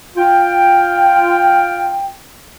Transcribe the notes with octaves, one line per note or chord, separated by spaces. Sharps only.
F4 G5